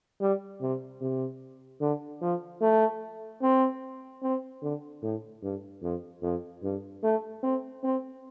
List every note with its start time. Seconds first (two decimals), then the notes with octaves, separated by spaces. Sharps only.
0.21 G3
0.61 C3
1.01 C3
1.81 D3
2.22 F3
2.61 A3
3.42 C4
4.23 C4
4.62 D3
5.03 A2
5.43 G2
5.83 F2
6.22 F2
6.63 G2
7.03 A3
7.43 C4
7.84 C4